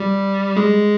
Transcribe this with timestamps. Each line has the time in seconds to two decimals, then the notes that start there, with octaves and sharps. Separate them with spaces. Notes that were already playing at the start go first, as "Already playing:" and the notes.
Already playing: G3
0.56 G#3